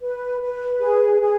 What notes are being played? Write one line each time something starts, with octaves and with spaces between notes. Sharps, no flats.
B4
B4
G#4
G#4